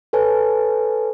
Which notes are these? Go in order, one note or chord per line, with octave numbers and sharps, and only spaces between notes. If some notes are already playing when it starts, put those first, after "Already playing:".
A4 B4 C#5 G#5 A5